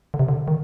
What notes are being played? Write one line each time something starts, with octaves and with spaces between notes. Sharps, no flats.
D3
C3
D3
D#3
D#3